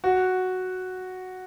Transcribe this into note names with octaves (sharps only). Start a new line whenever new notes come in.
F#4